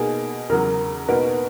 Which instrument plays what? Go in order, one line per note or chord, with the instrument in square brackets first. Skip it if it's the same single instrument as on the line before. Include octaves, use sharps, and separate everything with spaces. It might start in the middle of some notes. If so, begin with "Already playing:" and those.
Already playing: [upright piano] B2 A#3 D#4 [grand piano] G#4
[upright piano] E2 C#3 F#3 [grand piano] A#4
[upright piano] B2 A#3 D#4 F#4 A#4 [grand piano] B4